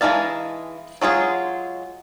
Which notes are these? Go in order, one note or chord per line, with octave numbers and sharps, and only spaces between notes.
E3 G#3 D#4 F5 A5
F#3 G#3 F4 G#4